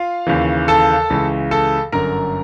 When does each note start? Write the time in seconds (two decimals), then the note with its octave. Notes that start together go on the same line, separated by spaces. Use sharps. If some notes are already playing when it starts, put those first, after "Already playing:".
Already playing: F4 F5
0.27 D#2 C#3 E3
0.68 A4 A5
1.10 C#2 C#3 E3
1.51 A4 A5
1.92 G1 F#2 D3 A#4 A#5